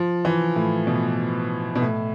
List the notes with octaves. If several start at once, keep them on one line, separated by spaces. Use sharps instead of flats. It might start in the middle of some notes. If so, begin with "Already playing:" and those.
Already playing: F3
E3
A2
B2
B2
A2